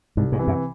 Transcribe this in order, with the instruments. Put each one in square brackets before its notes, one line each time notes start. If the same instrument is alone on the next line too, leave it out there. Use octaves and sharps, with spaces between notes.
[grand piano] C2 [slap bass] G#2
[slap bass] G#2
[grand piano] C3 E3
[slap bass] F#2